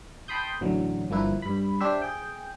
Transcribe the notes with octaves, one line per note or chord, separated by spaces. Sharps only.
G5 A5 B5 C6 D#6 G6
A1 A2 D3 F#3
G1 F3 A#3 E4 B4
G2 B5
D4 G4 C5 E5
G#4 G5